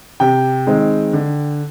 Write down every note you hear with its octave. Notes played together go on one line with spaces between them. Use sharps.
C3 G5
D#3 G#3 C4
D3